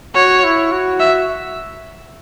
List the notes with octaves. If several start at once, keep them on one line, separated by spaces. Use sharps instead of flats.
F#4 C#5
E4
F#4
E5